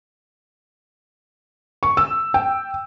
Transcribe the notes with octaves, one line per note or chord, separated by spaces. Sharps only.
C#6
E6
G5